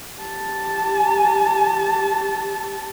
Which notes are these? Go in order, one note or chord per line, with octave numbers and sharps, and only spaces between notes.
G4 A5